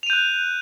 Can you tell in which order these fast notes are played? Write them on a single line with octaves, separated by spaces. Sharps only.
F7 D#7 G6 F#6